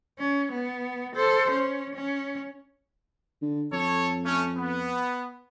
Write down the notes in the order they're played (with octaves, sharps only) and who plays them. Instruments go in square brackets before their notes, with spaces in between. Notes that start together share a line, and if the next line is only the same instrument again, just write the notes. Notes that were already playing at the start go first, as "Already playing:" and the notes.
[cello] C#4
B3
A4 C5
C#4
C#4
[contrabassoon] D3
[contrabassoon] F2 [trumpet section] A4 C#5
[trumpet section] A3 C#4
B3